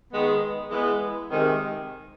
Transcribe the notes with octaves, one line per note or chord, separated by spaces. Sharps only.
D#3 G#3 B3
E3 G#3 B3
C3 D#3 G#3